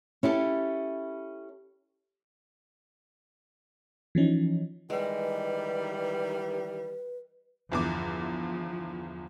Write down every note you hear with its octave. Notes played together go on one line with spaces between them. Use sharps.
C#4 E4 G4 A4
E3 F3 C#4 D#4
D#3 E3 G3 G#3 B4
G1 E2 F3 D6